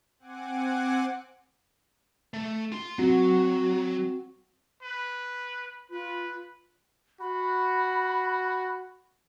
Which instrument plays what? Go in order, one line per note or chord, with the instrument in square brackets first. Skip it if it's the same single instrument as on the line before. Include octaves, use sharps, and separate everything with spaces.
[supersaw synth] C4 F#5 G#5 D6
[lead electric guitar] A3
F4 C6
[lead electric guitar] F#3 [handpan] C4 F#4
[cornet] B4
[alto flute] F4 [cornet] B4
[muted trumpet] F#4 [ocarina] B5